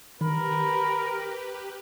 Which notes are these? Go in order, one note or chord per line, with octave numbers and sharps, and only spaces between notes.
D#3 G4 A#4 B4 B5